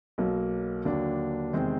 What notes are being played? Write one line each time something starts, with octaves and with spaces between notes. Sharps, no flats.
B1 B2 F#3 A#3
D#2 D3 F#3 A#3 D4
E2 C3 D#3 G#3 C4